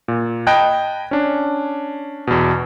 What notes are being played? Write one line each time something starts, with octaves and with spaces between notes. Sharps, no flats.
A#2
D#5 G5 A5 B5 F#6 G#6
C#4 D4
E2 B2